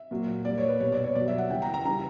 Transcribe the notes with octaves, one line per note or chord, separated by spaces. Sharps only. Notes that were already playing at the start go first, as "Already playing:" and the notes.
Already playing: E5
A#2 F#3
A#2 G3 D5
C#5
B4
B2 G3 C#5
D5
C#5
B2 F#3 D5
E5
F#5
C#3 E3 G3 G5
A#5
A#5
C#3 E3 G3 A#5